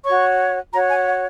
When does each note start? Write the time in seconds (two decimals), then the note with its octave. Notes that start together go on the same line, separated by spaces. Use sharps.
0.04 F#4 C#5 C#6
0.72 F#4 C#5 A#5
0.89 G#5
1.06 F#5